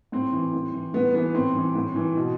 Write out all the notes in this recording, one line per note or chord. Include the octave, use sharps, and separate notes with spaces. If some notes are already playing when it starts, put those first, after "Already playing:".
A2 C4
E3
A2
E3
A2 B3
E3 B3
A2 C4
E3
A2
E3
B2